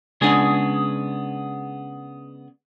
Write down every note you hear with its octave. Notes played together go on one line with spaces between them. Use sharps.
C#3 G#3 B3 D4 G#4